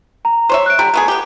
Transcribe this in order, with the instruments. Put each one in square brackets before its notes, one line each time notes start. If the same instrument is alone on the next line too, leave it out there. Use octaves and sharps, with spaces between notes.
[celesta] A#5
[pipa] C5 C#5 E5
[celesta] F#6 D7
[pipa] D3 G3 [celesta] A#5
[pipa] A3 B3 G#4
B3 G4